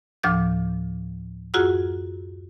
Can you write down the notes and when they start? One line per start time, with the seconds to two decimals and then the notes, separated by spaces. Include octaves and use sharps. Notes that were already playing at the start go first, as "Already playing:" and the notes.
0.23 D2 A2 F3 D6 G6
1.54 F#2 F4 F#4 G#4 F#5 E6